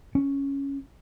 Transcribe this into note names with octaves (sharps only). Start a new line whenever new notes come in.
C#4